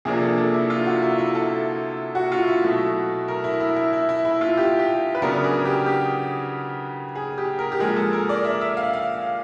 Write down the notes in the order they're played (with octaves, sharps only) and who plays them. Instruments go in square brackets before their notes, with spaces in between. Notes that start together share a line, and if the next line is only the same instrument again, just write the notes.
[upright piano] C3 F3 A#3 D4 G#4
A4
A4
E4
F4
F#4
E4
E4
A4
F#4
F4
E4
B2 F#3 A3
A#4
E4
E4
E4
E4
E4
E4
F4
G4
G4
B4
C#3 F#3 B3 D4 A#4
G#4
G4
G4
G#4
G4
A#4
G4
A#2 F3 G#3 G#4
A4
A#4
D5
E5
E5
F5
F5